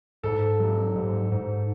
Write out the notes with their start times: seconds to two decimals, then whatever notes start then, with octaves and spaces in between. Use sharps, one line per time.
0.23 G#2 A4
0.60 F#3
0.96 G#2
1.32 G#2